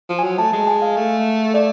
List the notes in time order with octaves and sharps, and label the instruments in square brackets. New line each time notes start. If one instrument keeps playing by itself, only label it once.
[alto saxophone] F3
[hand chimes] G#5
[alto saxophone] F#3
[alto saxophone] A3 [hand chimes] A5
[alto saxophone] G#3
[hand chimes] G#5
F5
[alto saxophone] A3
[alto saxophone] A3 [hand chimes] D5